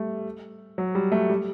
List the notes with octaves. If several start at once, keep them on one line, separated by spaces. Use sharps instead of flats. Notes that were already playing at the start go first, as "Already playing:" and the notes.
Already playing: G3 A3
F#3
G3
A3
G3